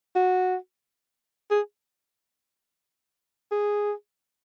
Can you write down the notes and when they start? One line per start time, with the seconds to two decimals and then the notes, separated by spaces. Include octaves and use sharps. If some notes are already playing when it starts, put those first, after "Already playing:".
0.15 F#4
1.50 G#4
3.52 G#4